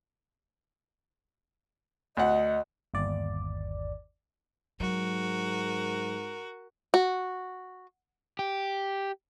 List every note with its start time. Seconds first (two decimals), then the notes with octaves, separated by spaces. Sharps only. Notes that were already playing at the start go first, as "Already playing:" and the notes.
2.17 D2 D#5 F#5
2.94 G1 D#2 D5
4.80 G#2 F#3 F#4 A#4
6.94 F#4
8.39 G4